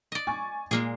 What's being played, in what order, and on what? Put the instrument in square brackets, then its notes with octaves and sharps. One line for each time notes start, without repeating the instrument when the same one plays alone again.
[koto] D5 D#5
[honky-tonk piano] G#5 C#6 A6
[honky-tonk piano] A#2 [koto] G#3 A#3 G#4